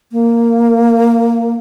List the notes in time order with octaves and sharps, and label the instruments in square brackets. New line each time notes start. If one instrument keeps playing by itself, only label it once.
[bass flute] A#3